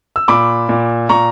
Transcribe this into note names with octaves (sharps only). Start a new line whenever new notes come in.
E6
A#2 B5 D6
A#2
A#2 A#5 C#6